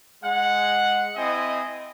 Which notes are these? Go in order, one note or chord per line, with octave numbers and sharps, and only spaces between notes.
G#3 F#5
C4 E4 D#5 G#5